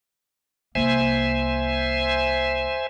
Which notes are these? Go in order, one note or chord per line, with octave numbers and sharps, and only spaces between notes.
C2 A#3 C5 E5 G#5